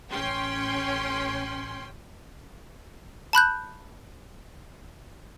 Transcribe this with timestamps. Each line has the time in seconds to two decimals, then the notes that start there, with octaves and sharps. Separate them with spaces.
0.11 A1 C#4 G5 C6
3.33 A5 B5 F#6 G6